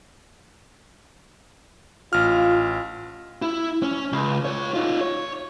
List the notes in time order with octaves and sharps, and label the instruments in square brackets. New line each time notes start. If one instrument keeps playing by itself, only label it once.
[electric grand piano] A1 F6 [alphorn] F4
[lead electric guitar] E4
C#4
C#2
F4 C#5
D#4 F4
C#5